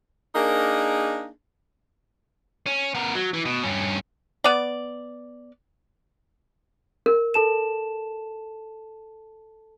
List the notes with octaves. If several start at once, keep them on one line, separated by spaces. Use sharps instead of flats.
A#3 D4 D#4 G#4 A#4
C#4
B3 A#4
F#3
E3
B2
G2 C#4
B3 D5
A#4
A4 A5 E7